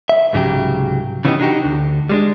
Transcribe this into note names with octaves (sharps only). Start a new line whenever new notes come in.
E5
C2 G#2 C#3 F#3 G4
C#3 E3 B3 C#4 D#4 G4
D4 D#4 F#4 G4
D2
G3 G#3 D4